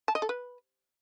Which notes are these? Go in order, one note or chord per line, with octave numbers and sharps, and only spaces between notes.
A5
D#5
A4
B4